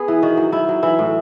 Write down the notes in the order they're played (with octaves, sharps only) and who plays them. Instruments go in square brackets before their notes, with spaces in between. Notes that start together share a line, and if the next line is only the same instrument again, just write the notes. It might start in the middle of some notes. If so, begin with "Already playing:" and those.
Already playing: [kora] B3 G#4
E3
D#3 F#4
F#3
D#3 E4
F#3
E3 E4
A2